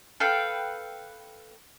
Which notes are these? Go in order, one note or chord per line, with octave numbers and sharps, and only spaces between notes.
A4 B4 F5 G5